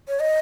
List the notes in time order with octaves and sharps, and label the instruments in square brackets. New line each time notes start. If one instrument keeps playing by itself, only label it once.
[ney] C#5
D#5